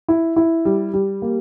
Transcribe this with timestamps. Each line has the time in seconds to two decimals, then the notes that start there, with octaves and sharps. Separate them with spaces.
0.08 E4
0.36 E4
0.65 G3
0.94 G3
1.22 A#3